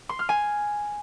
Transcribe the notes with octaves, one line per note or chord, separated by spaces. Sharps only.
C6
F6
G#5